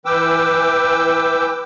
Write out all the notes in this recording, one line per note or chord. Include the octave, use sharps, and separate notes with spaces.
E3 B4 G5 D6 E6